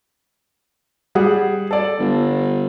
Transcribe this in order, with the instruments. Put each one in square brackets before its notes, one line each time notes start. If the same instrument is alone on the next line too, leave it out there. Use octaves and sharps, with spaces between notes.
[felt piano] G3 G#4 F#5
A4 D5
[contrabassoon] G1